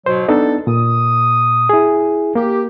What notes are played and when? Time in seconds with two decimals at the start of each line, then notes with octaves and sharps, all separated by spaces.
0.06 G#2 B2 F#3 C5
0.28 B3 D4 D#4 A4
0.67 A#2 D#6
1.69 E4 G#4
2.35 A#3 G4